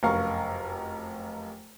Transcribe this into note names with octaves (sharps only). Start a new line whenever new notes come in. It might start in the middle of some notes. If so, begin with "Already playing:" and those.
F1 F#2 A#4 F5 C#6